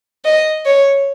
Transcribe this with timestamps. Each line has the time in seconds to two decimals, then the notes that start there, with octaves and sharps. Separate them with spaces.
0.25 D#5
0.65 C#5